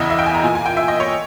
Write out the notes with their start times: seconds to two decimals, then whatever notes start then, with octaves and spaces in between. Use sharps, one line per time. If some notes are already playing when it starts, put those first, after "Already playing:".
Already playing: E2 C#3 E3 D#5 E5
0.10 E5
0.19 G5
0.26 G#5
0.34 A#5
0.43 A#2 G#5
0.55 G#5
0.66 G5
0.77 E5
0.88 D#5
1.00 C#5